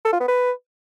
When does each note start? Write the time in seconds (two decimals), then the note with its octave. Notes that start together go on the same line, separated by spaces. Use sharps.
0.05 A4
0.13 F4
0.20 B3
0.28 B4